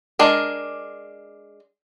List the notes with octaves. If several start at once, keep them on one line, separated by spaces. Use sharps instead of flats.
G#3 D4 A#4